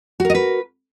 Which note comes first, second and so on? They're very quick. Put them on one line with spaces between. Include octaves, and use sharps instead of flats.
F#4 A#4 D#5 B4